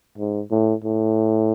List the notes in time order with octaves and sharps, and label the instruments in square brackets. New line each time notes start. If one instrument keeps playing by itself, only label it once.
[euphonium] G#2
A2
A2